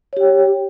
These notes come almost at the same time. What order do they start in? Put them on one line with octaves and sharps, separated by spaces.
C#5 G4 G5